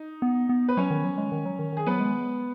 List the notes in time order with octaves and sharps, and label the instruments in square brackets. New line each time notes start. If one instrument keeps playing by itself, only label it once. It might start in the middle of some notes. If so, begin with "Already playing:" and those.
Already playing: [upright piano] D#4
[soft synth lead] B3
B3
[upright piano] B4
[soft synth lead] F#3 [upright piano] C#4 C#5
[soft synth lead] D#3
F#3
G#3
D#3
F#3
D#3
[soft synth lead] D#3 [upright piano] G#4
[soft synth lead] F#3 [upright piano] B3 B4
[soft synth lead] G#3